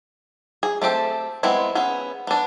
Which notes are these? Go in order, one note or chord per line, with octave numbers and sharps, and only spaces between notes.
G#4
A3 C4 G4 A4
E3 G#3 B3 C4 E4
B3 C#4 G#4
B3 D4